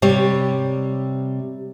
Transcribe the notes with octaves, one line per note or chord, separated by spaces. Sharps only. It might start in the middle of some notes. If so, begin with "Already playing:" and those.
C3 G3 C#5